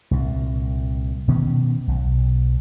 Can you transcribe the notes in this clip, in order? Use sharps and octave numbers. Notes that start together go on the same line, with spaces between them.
C2 A#2
B2 D#3 B3 C#4
B1